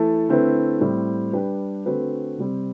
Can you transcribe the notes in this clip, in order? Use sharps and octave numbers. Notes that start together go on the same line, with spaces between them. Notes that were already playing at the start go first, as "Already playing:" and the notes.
Already playing: E3 A3 E4 A4
D3 A3 C4 E4 B4
A2 G3 C4
G3 D4 G4 B4
D3 A3 C4 F#4 B4
C3 G3 C4